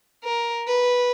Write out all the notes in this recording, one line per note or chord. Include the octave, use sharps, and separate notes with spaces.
A#4
B4